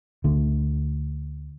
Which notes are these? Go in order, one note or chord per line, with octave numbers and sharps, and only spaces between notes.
D2 D3